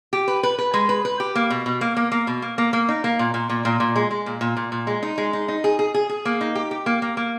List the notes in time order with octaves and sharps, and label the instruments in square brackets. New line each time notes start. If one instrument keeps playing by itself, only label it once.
[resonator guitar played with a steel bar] G4
B4
B4
B4
G#3
B4
B4
G4
A#3
B2
B2
A#3
A#3
A#3
B2
A#3
A#3
A#3
D#4
A#3
A#2
A#2
A#2
A#2
A#2
G#3
G#3
A#2
A#2
A#2
A#2
G#3
D#4
G#3
D#4
D#4
G#4
G#4
G#4
G#4
A#3
D#4
G4
G4
A#3
A#3
A#3